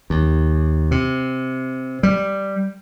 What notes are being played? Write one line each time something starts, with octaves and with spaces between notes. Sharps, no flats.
D#2
C3
G3